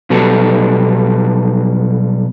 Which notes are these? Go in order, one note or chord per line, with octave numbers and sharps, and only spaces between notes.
B2 F#3 G3 B3 A4